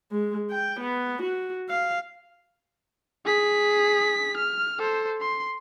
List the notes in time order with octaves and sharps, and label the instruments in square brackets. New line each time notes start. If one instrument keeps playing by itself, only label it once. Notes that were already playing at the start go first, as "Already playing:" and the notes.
[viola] G#3
G5
B3
F#4
F5
[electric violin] G#4 B6
F6
A4 C5
C6